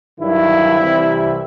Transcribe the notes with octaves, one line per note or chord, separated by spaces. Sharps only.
G2 D#3 F#3 E4
C2 C3 E3 G3